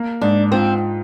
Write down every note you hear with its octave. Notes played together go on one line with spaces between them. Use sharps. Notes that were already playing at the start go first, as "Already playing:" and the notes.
Already playing: A#3
G#2 D4
C4 F4